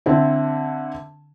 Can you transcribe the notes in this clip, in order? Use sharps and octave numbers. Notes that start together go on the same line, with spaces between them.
D3 C4 E4